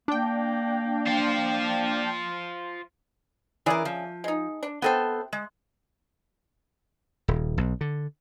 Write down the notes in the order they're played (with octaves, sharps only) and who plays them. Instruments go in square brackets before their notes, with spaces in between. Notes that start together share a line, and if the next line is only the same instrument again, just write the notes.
[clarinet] A#3 [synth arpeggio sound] D4 G5
[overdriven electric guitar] F4 C5
[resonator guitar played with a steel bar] E3 A#4 [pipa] C#4 G#4 D5
[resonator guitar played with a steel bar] F3
[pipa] G#3 D#4
D4
[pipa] C3 G5 [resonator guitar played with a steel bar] B3 A4 C5
[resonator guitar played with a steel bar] G#3
[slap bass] D#1
B1
D3